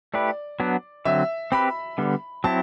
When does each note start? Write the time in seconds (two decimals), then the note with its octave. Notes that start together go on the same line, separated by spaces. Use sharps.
0.14 A3 E4 G4 B4 D5
0.60 F#3 B3 D4
1.05 D3 F#3 C4 E5
1.52 C4 G4 B4 B5
1.98 D3 G3 B3
2.44 F#3 C4 E4 A5